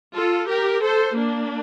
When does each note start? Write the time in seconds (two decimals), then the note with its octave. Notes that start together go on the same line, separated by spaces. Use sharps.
0.15 F4 A4
0.48 G4 A#4
0.82 A4 C5
1.16 A#3 D4